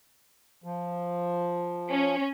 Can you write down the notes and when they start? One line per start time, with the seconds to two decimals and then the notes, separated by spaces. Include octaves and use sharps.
0.64 F3
1.90 C#4